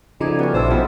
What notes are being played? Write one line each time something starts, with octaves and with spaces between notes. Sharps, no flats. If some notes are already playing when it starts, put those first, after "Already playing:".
D2 C#3 F3 D#4 D5 D#5 G#5
G3 B3 C#4
A#1 E3 D4 F#4 A4 C5 E6
G#2 B2 F3 G#3 D4 G4 B5